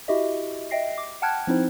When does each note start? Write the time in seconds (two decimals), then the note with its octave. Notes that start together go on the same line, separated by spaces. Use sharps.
0.08 E4 F#4 G4 D#5 E5
0.71 D#5 E5 G5 A#6 C7
0.98 D6
1.22 F#5 G5 A5 F6 F#6 G#6
1.47 F3 C4 D#4 E4 C5